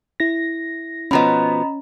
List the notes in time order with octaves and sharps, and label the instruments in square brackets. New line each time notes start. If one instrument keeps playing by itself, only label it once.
[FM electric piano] E4 A#6
[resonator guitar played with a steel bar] B2 F3 B3 [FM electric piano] C#4 [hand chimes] D#5 A#5 B5